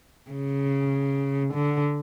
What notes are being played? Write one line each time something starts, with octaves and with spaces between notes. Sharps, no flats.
C#3
D3